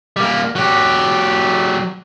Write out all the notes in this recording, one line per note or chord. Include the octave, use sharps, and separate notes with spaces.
G3 A#3
F#3 G4